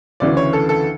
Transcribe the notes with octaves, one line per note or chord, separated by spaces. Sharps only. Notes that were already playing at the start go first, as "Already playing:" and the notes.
D2 C#3 E3 D5
C#5
A4
A4